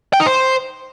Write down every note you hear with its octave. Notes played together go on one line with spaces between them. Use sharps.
G5
D#4
C5